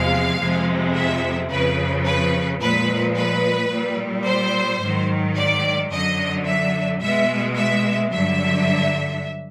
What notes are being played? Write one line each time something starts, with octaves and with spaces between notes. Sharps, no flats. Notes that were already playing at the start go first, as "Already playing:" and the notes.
Already playing: E2 C3 F3 G#3 F5
F2 C3 F3 G#3
E5
F2 C#3 F3 B4
B4
A#2 F3 G#3 B4
B4
A#2 G3
C5
G#2 D#3 F#3
D5
F#2 D3 F#3 D#5
E5
B2 G#3 E5
E5
G2 D3 F#3 E5